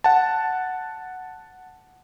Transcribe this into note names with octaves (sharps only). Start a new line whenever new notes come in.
F#5 A5